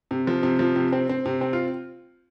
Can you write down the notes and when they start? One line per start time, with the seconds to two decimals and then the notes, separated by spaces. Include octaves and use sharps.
0.11 C3
0.27 F3
0.43 C3
0.59 F3
0.76 C3
0.92 C4
1.09 C4
1.25 C3
1.41 C4
1.53 F4